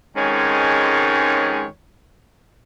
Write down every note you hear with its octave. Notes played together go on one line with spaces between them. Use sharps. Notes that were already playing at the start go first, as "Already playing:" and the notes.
F2 G#2 D#3 G#3 C#4 C#5